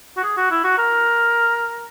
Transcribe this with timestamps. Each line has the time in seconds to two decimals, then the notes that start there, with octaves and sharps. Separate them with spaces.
0.17 F#4
0.24 G#4
0.38 F#4
0.51 E4
0.64 F#4
0.78 A#4